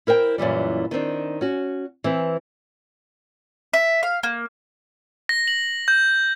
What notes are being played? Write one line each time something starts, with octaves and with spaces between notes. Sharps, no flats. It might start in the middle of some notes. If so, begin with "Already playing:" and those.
E4 A#4 C5 G5
F#2 A#2 E3 G3
D#3 B3 C4 D4
C#4 F#4
E3 C4 B4
E5
F5
A#3
A#6
F#7
G6